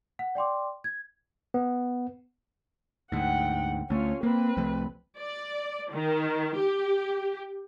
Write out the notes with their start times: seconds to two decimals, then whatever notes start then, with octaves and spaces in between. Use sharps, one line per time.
0.19 F#5
0.35 D5 G5 C6 D6
0.84 G#6
1.54 B3
3.12 D2 G#2 F#5 G5
3.90 D2 A3 C#4 F4
4.23 A#3 C4 B4
4.57 C2 F3 A3
5.20 D5
5.91 D#3
6.56 G4